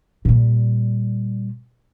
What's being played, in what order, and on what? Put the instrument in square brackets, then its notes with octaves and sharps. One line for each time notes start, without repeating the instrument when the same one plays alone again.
[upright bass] A#2 G3